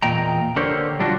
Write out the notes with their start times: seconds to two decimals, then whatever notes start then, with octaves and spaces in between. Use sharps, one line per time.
0.02 E2 A#2 D#5 G5 A#5
0.56 D3 G4 A#4 C5 C#5
1.00 G3 D4 F4 F#4